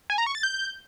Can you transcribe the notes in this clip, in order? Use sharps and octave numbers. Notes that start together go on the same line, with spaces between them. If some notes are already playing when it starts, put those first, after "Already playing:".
G#5
A#5
C#6
A6
G6